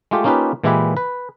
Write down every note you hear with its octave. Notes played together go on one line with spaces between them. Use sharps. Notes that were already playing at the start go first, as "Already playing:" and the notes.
G#3 A3 F4 G4
A#3 C#4 D#4 F4 G4 B4
A#2 E3 G#3 E4 G4 B4
B4